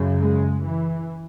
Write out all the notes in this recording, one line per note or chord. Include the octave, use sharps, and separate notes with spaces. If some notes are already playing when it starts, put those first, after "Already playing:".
Already playing: F#2 C#3
G#3
E3